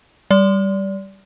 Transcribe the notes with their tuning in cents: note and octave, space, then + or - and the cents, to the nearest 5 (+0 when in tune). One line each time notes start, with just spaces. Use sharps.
G3 +0 D5 -25